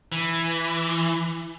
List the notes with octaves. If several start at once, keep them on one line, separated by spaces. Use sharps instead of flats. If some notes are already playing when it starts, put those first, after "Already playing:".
E3